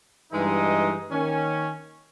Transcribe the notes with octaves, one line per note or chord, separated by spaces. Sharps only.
G2 E3 G#3 D#4
D#3 A#3 C#4